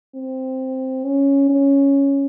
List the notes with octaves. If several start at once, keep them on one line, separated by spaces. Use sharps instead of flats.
C4
C#4
C#4